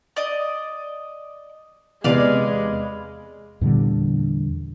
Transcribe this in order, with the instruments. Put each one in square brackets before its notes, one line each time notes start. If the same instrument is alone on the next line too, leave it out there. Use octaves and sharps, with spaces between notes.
[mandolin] D5 D#5
[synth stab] E2 C3 [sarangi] G#3 [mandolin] B4 D5 F5
[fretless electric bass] E2 A#2 D3 G3